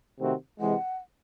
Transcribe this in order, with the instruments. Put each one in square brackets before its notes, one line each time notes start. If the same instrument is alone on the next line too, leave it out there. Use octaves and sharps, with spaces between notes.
[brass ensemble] C3 D#3 A3 C4 F#4
[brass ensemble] C3 E3 G#3 [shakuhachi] F#5